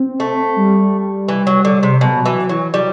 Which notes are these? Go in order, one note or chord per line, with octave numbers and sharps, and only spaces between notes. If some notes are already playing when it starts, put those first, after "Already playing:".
Already playing: C4
A3
G3
E3
F#3
D3
C3
B2 F#3
E3 F#3
E3 F#3
F#3 G3